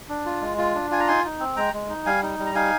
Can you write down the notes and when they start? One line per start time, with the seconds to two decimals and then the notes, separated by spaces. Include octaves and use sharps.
0.09 D4
0.26 F4
0.41 G#3
0.58 F4
0.75 D4
0.91 F4 G#5
1.00 A#5
1.07 D#4 G#5 C6
1.24 D#4
1.40 C4
1.57 G#3 G5 A#5
1.74 G#3
1.89 D#4
2.06 G3 F5 G#5
2.23 D#4
2.39 G3
2.46 A#5
2.55 D#4 F5 G#5